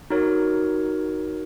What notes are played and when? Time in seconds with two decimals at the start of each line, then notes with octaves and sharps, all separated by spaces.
0.10 D#4 F#4 A#4 C#5